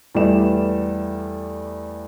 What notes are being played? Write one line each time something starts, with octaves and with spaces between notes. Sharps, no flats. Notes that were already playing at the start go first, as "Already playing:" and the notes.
E2 G3 A3 D5 E7